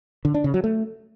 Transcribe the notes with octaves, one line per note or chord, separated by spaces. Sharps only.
D3
D4
C#3
F#3
A3